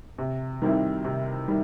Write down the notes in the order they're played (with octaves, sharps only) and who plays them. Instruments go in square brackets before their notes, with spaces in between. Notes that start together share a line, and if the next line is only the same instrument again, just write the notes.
[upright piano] C3
D#3 G3 C4 E4
C3
D#3 G3